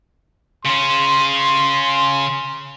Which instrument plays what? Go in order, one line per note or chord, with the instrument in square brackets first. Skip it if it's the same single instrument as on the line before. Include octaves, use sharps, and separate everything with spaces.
[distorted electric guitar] C#3 C#4 [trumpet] C6